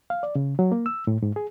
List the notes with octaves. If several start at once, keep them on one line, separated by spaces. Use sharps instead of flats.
F5
D5
C#3
F#3
A#3
E6
A2
G#2
G#4